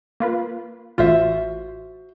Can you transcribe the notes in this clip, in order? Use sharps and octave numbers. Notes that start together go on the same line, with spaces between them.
A#3 F4 B4
A1 F4 F#4 C5 E5